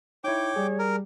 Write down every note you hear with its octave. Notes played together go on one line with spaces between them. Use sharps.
D#4 E4 C#5 G5 D6
G3 G#4 D5
A#4